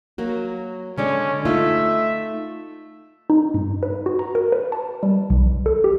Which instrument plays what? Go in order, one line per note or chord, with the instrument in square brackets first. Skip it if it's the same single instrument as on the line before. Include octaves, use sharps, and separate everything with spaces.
[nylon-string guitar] F#3 A#3 F#4
[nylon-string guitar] D3 G#3 D5 [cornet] C#4
[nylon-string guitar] A3 D#4 F4 [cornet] E5
[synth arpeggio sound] D#4
G2
B4
F#4
A#5
A#4
B4
A5
G3
B1
A4
G4